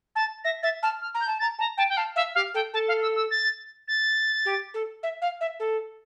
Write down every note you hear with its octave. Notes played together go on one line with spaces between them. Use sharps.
A5 A6
E5 A#6
E5 A6
A5 F6
F6
A#5
G6
A5
A#5 A6
A5 A#5
G5 A5
G5
F5 A5
E5 F5
G4 F5
A4 G5
A4 A5
F5
E6
E6
A6
A6
G4
A4
E5
F5
E5
A4